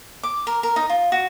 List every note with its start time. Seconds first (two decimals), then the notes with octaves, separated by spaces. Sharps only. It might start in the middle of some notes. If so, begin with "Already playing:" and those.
0.23 D6
0.47 A#4
0.63 A#4
0.76 D#4
0.90 F4
1.12 F#4